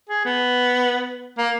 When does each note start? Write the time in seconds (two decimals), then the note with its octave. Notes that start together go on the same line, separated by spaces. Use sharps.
0.09 G#4
0.25 B3
1.38 A#3